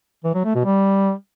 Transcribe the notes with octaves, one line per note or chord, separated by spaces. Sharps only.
E3
F#3
A3
B2
G3